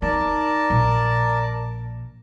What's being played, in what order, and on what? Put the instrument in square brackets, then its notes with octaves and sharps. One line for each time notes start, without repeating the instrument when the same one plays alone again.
[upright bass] D#4 [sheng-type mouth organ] A#4 D5 A5
[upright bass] A#1